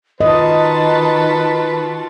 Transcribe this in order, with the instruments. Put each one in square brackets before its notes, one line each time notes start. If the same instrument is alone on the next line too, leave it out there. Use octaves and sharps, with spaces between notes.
[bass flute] D#3 [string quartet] F4 F#4 A5 [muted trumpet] B4 [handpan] D#5